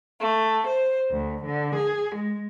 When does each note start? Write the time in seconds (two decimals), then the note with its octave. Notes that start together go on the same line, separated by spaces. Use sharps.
0.20 A3
0.67 C5
1.11 D2
1.45 D3
1.75 G#4
2.14 G#3